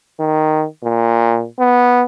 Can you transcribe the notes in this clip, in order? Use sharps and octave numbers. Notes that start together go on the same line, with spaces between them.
D#3
A#2
B3